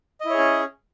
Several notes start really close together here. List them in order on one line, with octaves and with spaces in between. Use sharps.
D#5 E4 C#5 G#4 C#4